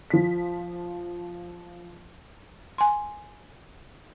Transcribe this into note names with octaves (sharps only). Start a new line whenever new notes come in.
F3 B6
G#5 C6